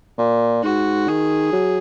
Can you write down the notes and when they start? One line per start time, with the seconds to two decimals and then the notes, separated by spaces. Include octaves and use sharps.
0.18 A#2
0.63 G#2 F#4
1.08 D#3 G#4
1.52 F#3